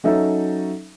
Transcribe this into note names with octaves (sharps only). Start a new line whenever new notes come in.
F#3 C#4 D#4 A4 E5